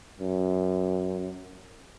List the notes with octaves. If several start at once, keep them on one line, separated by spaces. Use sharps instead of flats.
F#2